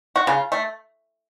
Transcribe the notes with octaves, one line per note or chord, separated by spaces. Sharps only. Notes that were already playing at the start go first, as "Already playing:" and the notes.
F#4
C#3 F4
A3